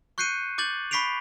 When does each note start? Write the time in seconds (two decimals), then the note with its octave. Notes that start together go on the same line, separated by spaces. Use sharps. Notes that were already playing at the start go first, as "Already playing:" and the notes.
0.18 C#6 F#6 G6 C7 C#7 D#7
0.58 D6 G6 A6 F#7
0.91 B5 C#6 B6 C7 D7 F7